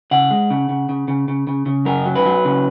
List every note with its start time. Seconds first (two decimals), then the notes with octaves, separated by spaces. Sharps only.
0.11 C#3 F#5
0.31 G#3
0.50 C#3
0.69 C#3
0.89 C#3
1.08 C#3
1.28 C#3
1.47 C#3
1.66 C#3
1.85 F#2 A#4
2.06 F#3
2.15 B4
2.26 F#3
2.45 C#3